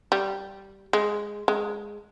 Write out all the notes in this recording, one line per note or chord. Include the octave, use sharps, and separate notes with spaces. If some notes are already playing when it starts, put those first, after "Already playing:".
G3
G#3
G#3